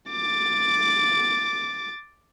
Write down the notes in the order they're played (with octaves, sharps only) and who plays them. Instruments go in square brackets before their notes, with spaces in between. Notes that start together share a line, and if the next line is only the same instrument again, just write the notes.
[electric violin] D6 A6